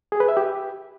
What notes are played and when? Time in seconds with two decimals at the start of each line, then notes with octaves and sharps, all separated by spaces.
0.12 G#4
0.20 B4
0.29 E5
0.37 G4